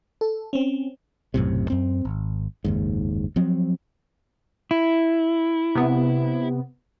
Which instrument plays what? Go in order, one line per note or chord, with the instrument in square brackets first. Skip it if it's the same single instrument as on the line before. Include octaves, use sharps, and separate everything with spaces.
[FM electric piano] A4
C4 C#4
[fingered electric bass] B1 F#2 A2 C3
F#2 C4
G#1
F#1 D#2 G#2
F3 F#3 C4
[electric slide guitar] E4
[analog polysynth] C3 B3